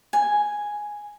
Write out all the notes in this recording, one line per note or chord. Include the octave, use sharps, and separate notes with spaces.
G#5